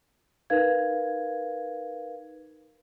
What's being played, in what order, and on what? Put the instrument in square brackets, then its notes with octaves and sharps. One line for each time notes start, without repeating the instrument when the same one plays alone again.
[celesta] D#4 A#4 B4 F5 G#6